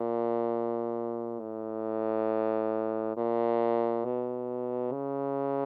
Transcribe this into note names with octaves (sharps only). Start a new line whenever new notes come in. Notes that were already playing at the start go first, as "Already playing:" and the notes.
Already playing: A#2
A2
A#2
B2
C#3